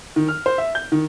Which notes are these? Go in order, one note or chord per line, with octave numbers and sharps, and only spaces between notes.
D#3
F6
C5
E5
G6
D#3